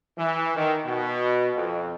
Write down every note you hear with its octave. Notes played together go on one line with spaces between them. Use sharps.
E3
D#3
B2
F2